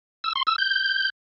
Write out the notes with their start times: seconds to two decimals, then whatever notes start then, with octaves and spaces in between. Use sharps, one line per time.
0.24 E6
0.35 C6
0.47 E6
0.58 G6